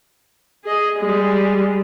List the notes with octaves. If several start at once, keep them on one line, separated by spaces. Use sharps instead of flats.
G#4 D#5
G3 G#3